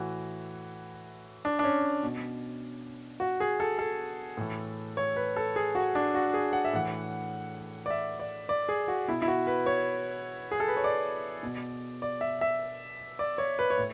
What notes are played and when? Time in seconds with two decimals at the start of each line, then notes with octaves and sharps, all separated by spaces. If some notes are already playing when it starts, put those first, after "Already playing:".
Already playing: A2 E3 F#4
1.45 D4
1.59 D4
1.64 C#4
2.03 B2
3.20 F#4
3.40 G#4
3.60 A4
3.79 A4
4.37 A2 E3
4.97 C#5
5.16 B4
5.36 A4
5.56 G#4
5.75 F#4
5.95 D4
6.14 F#4
6.34 G#4
6.53 F#5
6.65 E5
6.73 A2 E3 F#5
7.86 D5
7.90 E5
8.19 D5
8.49 D5
8.69 G#4
8.88 F#4
9.08 B2 E4
9.22 E4
9.28 F#4
9.47 B4
9.66 C#5
10.51 G#4
10.60 A4
10.68 B4
10.77 C#5
10.84 D5
11.43 B2
12.02 D5
12.21 E5
12.41 E5
13.19 D5
13.38 C#5
13.59 B4
13.70 C#5
13.78 A2